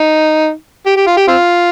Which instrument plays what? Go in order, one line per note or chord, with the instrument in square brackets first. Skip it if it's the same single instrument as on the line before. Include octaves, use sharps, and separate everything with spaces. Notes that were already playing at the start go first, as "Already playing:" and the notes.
Already playing: [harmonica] D#4
G4
G4
F4
G4
C4 F4